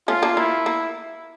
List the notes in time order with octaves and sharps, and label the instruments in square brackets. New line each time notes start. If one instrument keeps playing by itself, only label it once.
[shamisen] A3 C#4 [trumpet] F4
[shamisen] A#3 D4
[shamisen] A#3 [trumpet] E4
[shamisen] A#3